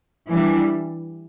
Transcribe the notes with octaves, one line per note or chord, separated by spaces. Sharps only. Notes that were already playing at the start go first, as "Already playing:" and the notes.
E3 G3 D4